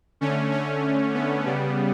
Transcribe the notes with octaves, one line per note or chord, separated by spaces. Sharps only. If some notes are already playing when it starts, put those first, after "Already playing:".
D3 A3 C#4
C#4
B3
C#3 G3